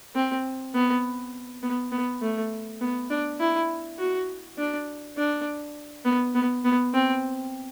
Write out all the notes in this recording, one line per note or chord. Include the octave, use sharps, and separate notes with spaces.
C4
B3
B3
B3
A3
B3
D4
E4
F#4
D4
D4
B3
B3
B3
C4